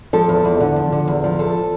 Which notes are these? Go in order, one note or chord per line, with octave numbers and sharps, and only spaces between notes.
F3 A4
E2
E2
D3
F3
D3
E2
F3
E2 A4